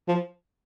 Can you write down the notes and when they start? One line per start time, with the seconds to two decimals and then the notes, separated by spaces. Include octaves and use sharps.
0.08 F3